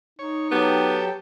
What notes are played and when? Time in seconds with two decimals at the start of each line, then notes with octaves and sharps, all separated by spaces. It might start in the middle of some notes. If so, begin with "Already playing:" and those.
0.19 D#4 C#5
0.52 F#3 B3 G4 A4 G5